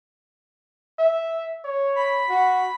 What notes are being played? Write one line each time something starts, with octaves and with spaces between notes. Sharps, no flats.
E5
C#5
B5
F#4